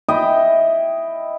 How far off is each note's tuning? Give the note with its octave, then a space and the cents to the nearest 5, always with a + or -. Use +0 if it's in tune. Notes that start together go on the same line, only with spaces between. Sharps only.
E4 +0 D#5 +0 G5 +0